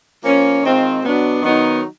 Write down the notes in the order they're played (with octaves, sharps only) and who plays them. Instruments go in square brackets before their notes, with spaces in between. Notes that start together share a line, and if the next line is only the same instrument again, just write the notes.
[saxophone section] F3 A#3 C#4
D#3 G#3 C4 F4
B2 F#3 B3 D4
D#3 F#3 B3 D#4